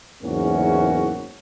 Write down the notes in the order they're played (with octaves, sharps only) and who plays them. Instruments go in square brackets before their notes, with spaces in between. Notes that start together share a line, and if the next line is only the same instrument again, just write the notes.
[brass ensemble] F#1 E2 G#2 A#3 C#4 F#4